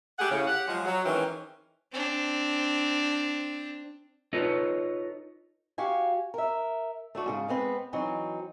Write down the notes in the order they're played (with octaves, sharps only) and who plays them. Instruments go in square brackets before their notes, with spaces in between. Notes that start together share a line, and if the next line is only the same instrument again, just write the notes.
[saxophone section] A3 G4 G#4 F#5
A2 C#3
G4 F#5
F3 F#3 G#3
F#3
D#3 E3 G#3 C4 C#4
[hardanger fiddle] C4 D4
[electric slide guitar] D#4 F4 A4 B4 C#5 D#5
[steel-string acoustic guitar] F#4 G4 F5 G#5
A#4 E5
A3 D4 F#4 A4
G#2 C#3 F4
G#3 B3 C4 B4
E3 F#3 C4 D#4